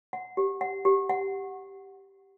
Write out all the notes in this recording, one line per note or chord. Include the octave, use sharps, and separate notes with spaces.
F#5
G4
F#5
G4
F#5